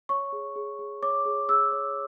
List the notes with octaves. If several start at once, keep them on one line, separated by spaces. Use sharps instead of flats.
C#5 C#6
G#4
G#4
G#4
C#5 D6
G#4
G#4 E6
C#5